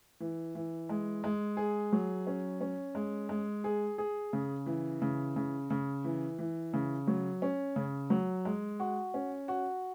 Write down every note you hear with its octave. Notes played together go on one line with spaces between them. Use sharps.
E3
E3
G#3
G#3
G#4
F#3
C#4
C#4
G#3
G#3
G#4
G#4
C#3
E3
C#3
C#3
C#3
E3
E3
C#3
F#3
C#4
C#3
F#3
G#3
F#4
C#4
F#4